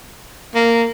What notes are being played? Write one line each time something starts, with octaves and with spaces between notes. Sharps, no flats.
A#3